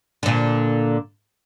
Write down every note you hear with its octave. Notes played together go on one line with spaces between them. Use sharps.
A#2 D3